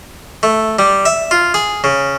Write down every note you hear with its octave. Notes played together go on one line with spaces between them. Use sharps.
A3
G3
E5
F4
G#4
C#3